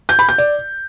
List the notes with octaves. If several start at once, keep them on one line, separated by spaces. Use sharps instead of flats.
G6
B5
G6
D5